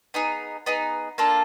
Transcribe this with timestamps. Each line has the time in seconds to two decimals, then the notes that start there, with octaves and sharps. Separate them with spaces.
0.14 B3 D#4 G#4
0.66 B3 D#4 G#4
1.18 A#3 D4 F4 A4